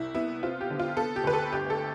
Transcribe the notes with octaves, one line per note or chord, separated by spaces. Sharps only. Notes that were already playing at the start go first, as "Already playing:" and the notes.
Already playing: C2 E4
B3 E4
C4 F4
G4
D3
F4
B3 A4
G4
D2 B4
A4
G1 G4
A4